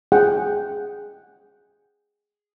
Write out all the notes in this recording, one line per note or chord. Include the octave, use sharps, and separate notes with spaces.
G#4 F#5 G5